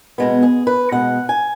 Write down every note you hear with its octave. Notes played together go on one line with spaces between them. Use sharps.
B2 G#3 B3
G#4
B4
B2 G#3 B3 F#5
G#5